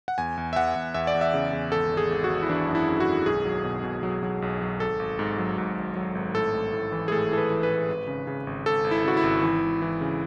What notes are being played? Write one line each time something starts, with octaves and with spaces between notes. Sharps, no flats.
F#5
E2 G#5
E2
E5
E2 F#5
E2
E2 E5
D5
E2
E5
C#3
E2
G#1 A4
G#1
G#4
G#1
F#4
G#1
E4
E3 D4
F#2
E4
F#2
F#4
G#1
B1 G#4
F#3
B2
B2
F#3
F#3
B1
F#3
G#1 A4
G#1
G#2
F#3
G#2
G#1
F#3
G#1
A2 A4
A1
A2
E3
G#4
A2 A4
E3 A4
B4
E3
B4
A2
G#1
C#3
C#3
G#1
G#1 A4
G#1
E4
C#3 F#4
E4
G#1
E3
G#1
E3
C#3